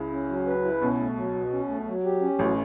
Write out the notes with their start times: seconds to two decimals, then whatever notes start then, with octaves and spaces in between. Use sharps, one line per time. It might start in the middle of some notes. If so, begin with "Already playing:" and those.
Already playing: C#2 C#3 E4
0.12 C#4
0.29 F#3
0.47 B4
0.64 E4
0.81 B1 B2 C#4
0.99 A3
1.16 F#3
1.34 B2
1.51 C#4
1.69 A3
1.86 F#3
2.04 G4
2.21 C#4
2.39 A1 A2 F#3